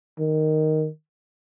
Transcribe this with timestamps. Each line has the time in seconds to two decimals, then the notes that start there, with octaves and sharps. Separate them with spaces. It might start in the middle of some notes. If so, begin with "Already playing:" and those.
0.19 D#3